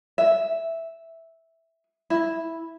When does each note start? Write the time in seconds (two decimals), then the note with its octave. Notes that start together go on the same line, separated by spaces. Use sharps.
0.18 E5
2.10 E4